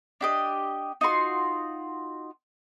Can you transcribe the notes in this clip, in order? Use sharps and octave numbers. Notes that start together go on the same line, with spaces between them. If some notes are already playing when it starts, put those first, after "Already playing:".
D4 G4 D#5
D#4 F4 F#4 C6